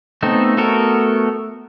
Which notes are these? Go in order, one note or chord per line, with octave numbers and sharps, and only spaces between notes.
A3 B3 C4 D#4 A4
A3 B3 F#4 A4 A#4